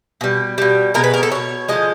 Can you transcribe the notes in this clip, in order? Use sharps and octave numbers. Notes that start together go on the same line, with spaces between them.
B2 G3
B2 G3
B2 G#3 A#4
B4
A#4
A4
B2 G#3 C#5
D3 F3 G#3 D#5